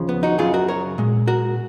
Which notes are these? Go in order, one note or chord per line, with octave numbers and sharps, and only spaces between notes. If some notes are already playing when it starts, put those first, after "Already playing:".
Already playing: D#2 C#3 F3
B3
D#4 F#4
F#2 C#3 F#3 F4 G#4
F#4 A#4
A#4 C#5
A#2 G#3
F#4 A#4